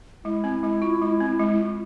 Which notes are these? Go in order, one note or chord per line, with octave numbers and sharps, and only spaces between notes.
G#3 E4
C4
G#3
F4
G#3
C4
G#3
F4